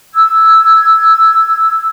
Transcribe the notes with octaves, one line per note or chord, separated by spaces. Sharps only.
E6 G#6